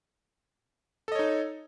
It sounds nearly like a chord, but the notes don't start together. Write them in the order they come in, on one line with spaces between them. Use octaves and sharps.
A4 D#5 C#5 D#4